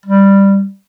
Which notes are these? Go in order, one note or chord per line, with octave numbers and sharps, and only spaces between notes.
G3